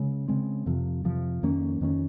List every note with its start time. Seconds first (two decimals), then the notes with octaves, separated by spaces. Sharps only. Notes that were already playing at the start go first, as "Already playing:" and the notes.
Already playing: C#3 G#3
0.28 C#3 G#3 C4
0.66 F2 C3 F3
1.05 F2 C3 F3
1.43 F2 D#3 A#3 C#4
1.81 F2 D#3 A#3 C#4